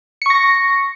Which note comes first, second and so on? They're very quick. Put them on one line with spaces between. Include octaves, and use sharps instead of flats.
C#7 C#6 A#6